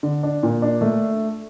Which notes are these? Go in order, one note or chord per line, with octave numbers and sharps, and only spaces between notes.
D3
D4
A#2
D4
A3